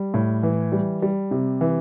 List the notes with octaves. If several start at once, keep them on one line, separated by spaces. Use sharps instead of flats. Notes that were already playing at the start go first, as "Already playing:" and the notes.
Already playing: G3
A2
E3
G3
G3
C3
E3